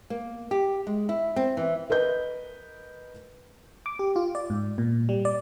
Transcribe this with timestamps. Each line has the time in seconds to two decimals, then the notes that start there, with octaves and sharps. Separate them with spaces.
0.10 A#3
0.51 G4
0.87 G#3
1.09 E4
1.36 C4
1.57 E3
1.90 A#4 B4 D#5 G6
3.86 D6
3.99 G4
4.16 F4
4.35 D5
4.50 G#2
4.78 A#2
5.09 G3
5.25 D5